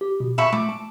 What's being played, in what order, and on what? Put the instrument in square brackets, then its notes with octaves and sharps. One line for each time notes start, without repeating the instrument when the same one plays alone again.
[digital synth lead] G4
B2
[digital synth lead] A#2 [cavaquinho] E5 B5 C#6
[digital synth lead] A3 [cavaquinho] D6
[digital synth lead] A5